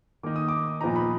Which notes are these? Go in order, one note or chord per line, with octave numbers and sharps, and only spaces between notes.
D#3 A#3 D#4 D6
D#6
D6
A#2 F3 B3 D#4 A#5
B5